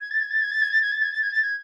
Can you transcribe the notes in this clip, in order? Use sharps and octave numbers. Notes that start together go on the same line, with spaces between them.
G#6
A6
G#6
A6
G#6
A6
G#6
A6
G#6
A6
G#6
A6
G#6
A6
G#6